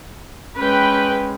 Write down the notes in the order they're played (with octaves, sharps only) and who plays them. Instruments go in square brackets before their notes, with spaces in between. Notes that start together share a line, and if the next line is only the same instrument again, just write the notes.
[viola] G#3 C#4 [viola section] B4 G5